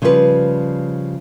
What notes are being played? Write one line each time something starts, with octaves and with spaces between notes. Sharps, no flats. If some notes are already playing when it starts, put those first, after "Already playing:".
C#3 F3 G3 F4 F#4 B4